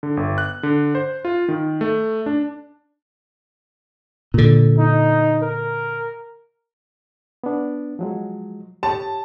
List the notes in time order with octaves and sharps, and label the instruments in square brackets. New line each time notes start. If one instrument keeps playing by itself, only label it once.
[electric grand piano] D3
G1
F#6
D3
C5
F4
D#3
A3
D4
[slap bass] A#2 D3
[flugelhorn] D#4
A#4
[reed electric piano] B3 D4
F3 F#3 G#3
[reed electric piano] G4 C#5 [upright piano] A5